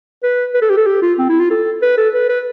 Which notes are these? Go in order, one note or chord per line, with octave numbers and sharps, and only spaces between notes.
B4
B4
A4
G4
A4
G4
F4
C4
E4
F4
A4
B4
A4
B4
B4